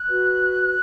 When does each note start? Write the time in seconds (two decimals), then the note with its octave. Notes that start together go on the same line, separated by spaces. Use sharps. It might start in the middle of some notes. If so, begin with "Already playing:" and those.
Already playing: F#6
0.09 F#4 B4